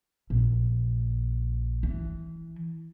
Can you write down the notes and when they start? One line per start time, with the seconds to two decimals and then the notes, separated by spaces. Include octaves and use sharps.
0.30 A#1
1.83 E3